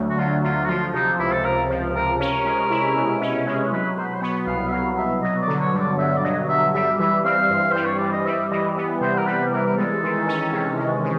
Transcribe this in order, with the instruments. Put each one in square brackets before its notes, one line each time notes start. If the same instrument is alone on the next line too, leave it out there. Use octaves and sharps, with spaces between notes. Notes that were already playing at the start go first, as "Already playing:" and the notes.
Already playing: [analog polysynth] D2 D3 F#3 A3
[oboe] F#4
[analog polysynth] F#3 [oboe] F4
[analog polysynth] D3 [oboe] F4
[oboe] F#4
[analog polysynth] F3 [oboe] F4
[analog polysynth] C3 [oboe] D#4
[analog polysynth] C#2 [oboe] E4
[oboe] A4
[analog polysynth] C#2 [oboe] A#4
[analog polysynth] F3
[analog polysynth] C3 [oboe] A#4
[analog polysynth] C#4 [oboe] A#4
[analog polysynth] G#3
E4
B2
C#4
G#3
[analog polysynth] F#3 [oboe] B4
[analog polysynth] B2 [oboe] C5
[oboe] B4
C5
[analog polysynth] B3 [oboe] C#5
[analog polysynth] C2 [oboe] F5
[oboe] E5
[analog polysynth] F#3 [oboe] F5
[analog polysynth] B2 [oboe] E5
[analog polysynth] F#3 [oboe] D#5
[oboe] D5
[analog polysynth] D3
[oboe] C#5
[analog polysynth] G2
[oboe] D5
[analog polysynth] G2 [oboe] E5
[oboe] D5
[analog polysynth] F#3 [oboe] D#5
[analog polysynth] D3 [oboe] E5
[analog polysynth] G3 [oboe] E5
[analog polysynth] E3 [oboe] E5
[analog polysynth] C4 [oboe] F5
[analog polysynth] G2
[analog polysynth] G3 [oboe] C5
[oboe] C#5
[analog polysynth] E3 [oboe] D5
[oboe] D#5
[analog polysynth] G3 [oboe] E5
[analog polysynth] E3 [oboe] D#5
[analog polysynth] B3
[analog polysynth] C3 [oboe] C5
[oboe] A#4
[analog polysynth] G3 [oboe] B4
[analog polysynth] E3 [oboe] A#4
[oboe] A#4
[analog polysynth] G#3 [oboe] A4
[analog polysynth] D#3
C#4
C3
G#3
D#3